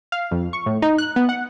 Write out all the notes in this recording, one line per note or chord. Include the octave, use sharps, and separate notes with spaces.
F5
F2
C#6
A2
D#4
F#6
B3
F#5